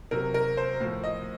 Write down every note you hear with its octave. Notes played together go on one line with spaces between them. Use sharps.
C3 F#3 A#4
A#4
C5
A2 F3
D#5